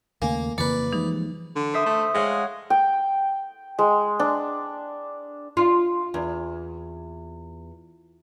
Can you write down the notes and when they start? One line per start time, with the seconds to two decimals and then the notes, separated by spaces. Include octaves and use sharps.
0.22 D#2 C#3 A3 A#3 G#5
0.58 F2 C#3 E3 A#3 B4 D5
0.92 E3 F3 G3 G#3 D#4
1.56 D3
1.74 C5 E5 D#6
1.86 A3
2.15 G#3 C#5 F5 F#5
2.70 G5
3.79 G#3
4.20 D4
5.57 F4
6.14 E2